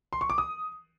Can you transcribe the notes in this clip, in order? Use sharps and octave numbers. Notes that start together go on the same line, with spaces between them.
C6
C#6
D6
D#6